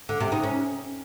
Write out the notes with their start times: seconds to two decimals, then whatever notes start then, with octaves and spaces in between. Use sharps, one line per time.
0.09 D3
0.20 C3
0.32 D#4
0.43 C#4